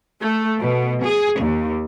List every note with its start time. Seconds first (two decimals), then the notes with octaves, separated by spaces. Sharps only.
0.21 A3
0.59 B2
1.03 G#4
1.39 D#2